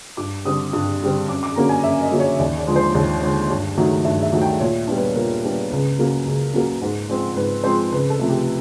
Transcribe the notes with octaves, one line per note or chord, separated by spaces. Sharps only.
G2 D6
D3 G3 C4 D#6
G2
D3 G3 C4
F#2 D6
D6
D3 F#3 A#3 C#4 A#5
G#5
F#2 E5
D#5
D3 F#3 A#3 C#4
C#5
D#2 D5
D5
D3 F3 G#3
C5
D#2 D5
D3 F3 G#3
G2
D#3 F#3 A3
G2 E5
E5
D#3 F#3 A3
G5
A#2 C#5
G3 B3 D4
B4
A#2 A#4
G3 B3 D4
C#2 B4
C#3 F#3 A#3
C#2
C#3 F#3 A#3
G#2
F3 G#3 C4
G#2 B4
F3 G#3 C4 C5
C#2 B4
A4
C3 F3 A3
G4